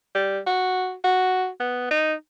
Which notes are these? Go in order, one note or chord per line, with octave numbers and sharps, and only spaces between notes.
G3
F#4
F#4
B3
D#4